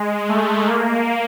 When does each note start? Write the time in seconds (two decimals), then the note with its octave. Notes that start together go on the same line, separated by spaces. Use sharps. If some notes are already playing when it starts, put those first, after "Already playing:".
Already playing: G#3
0.29 A3
0.66 A#3